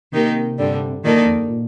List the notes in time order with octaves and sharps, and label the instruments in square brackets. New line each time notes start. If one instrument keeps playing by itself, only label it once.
[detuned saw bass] C3 [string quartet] D#3 A#3 D#4 G4 A#4
[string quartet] G2 D3 G3 D4
[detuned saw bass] A#2 [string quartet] D#3 A#3 D#4 A4 D5
[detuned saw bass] D3
F2
G2
A#2